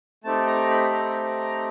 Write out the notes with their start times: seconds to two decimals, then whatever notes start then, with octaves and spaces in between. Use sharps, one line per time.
0.24 A3 C4 D#4 G4 A5
0.47 A#5
0.70 B5
0.93 A#5